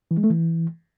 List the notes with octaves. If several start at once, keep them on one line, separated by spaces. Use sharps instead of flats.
E3
G#3
A3
E3